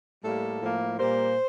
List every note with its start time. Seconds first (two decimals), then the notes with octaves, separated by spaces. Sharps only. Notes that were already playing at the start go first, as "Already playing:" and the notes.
0.23 A2 G3 A#3 A4
0.61 A2 F3 A#3
0.99 A#2 G3 A#3 C5